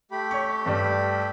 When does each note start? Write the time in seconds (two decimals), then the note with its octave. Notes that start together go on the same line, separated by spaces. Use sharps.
0.11 A3 G4 B5
0.31 C#5 C#6
0.66 G2 G3